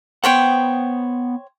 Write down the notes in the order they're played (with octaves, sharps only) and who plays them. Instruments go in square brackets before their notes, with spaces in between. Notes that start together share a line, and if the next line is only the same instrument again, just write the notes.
[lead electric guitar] B3 F#5 [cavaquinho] C5 C#5 G5